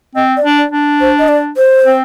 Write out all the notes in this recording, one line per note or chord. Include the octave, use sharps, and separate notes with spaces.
C4 D#5
D5
D4
D5
D4
C5
D#5
D5
C5
C4